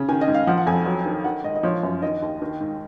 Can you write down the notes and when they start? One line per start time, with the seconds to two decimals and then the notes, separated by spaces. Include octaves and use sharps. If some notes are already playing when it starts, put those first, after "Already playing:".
Already playing: C#3
0.09 D#3 G#5
0.21 D#5
0.28 G#2
0.34 F5
0.47 F3 F#5
0.57 F#5
0.67 F2 G#5
0.86 F#3
1.06 D#3
1.24 D#3 F#5
1.44 G#2 D#5
1.55 D#5
1.63 F3 C#5
1.83 F#2
2.02 D#3 D#5
2.22 D#2
2.42 D#3
2.61 G#2